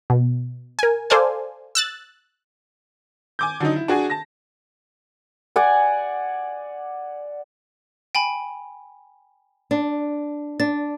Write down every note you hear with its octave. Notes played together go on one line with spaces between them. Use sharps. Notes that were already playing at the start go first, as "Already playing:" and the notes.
B2
A#4 G#5
A4 C5 D5 F5 G#5
E6 F#6 A6
G#5 D6 G6
D3 F#3 D#4
E4
D4 F#4 G#4 G#5
A5 A#6
D5 F#5 G#5
G5 G#5 B5
D4
D4 A6